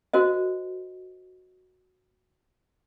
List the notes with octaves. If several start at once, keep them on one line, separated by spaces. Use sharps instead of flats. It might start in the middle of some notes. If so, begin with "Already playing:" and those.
F#4 A#4 C5 D#5